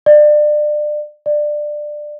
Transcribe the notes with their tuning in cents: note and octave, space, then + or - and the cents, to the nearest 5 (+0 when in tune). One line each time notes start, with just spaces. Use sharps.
D5 +30
D5 +20